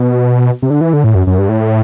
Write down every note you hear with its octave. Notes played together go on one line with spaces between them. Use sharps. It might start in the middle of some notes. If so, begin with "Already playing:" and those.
Already playing: B2
C3
D3
E3
D3
A2
F#2
F#2
G2
A2